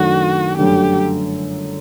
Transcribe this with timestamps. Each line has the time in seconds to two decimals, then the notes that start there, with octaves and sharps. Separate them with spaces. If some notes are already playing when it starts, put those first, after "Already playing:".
Already playing: F#2 D#3 A3 D4 F#4
0.57 G1 F#2 D3 A3 D4 G4